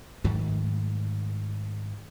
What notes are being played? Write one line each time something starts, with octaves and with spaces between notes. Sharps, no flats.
G#2 D#3 F#3 A3